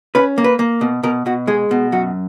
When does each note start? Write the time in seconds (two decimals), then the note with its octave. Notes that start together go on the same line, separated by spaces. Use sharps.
0.15 C#4 B4
0.38 A#3
0.44 B4
0.59 A#3
0.81 B2
1.03 B2 A#4
1.26 B2 F#4
1.47 G#3 G#4
1.71 B2
1.92 F#2 F#4